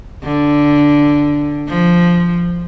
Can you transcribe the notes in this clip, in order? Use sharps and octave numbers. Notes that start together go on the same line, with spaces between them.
D3
F3